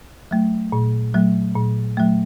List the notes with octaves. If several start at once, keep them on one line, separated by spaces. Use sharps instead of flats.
F#3 A3
A#2
F#3 A3
A#2
F#3 A3